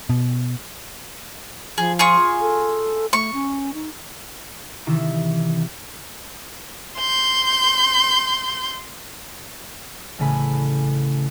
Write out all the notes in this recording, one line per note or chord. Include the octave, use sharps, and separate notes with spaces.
B2
F3 G#4
F4 G#4 C#6
A4
A3 C#6
C#4
D#4
C3 D#3 E3 E4
C6 G6
A1 C#3 A3 G#5 B5